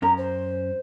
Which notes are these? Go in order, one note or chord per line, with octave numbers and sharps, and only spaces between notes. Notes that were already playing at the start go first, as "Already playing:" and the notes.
F#2 C#4 A#4 A#5
C5